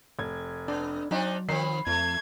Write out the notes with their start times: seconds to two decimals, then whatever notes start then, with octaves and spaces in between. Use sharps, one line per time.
0.19 F1 G#6
0.68 B3 D4
1.11 F#3 C4 D4 D#4
1.49 D#3 F3 B3 C4 C7
1.87 F2 A3 G#6